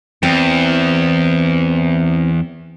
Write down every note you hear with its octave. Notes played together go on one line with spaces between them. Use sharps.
E2 C4